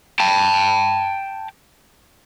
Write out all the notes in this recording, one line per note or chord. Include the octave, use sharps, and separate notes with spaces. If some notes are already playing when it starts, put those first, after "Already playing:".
G5 A5